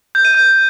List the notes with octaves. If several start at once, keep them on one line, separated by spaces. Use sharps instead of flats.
G6
D#7
G6